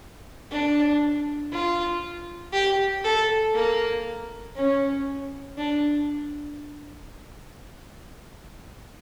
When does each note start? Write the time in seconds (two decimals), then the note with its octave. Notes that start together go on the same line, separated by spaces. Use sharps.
0.51 D4
1.52 F4
2.53 G4
3.04 A4
3.55 A#3
4.56 C#4
5.57 D4